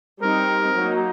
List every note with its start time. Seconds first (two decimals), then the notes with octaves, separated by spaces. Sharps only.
0.21 G3 C4 D#4 A#4
0.75 F#3 A#3 D#4